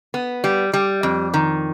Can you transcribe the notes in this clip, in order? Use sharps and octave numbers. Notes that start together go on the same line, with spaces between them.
B3
G3
G3
F2
D#3